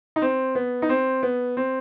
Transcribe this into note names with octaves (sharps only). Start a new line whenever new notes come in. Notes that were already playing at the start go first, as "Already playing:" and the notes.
D#4
C4
B3
D#4
C4
B3
C4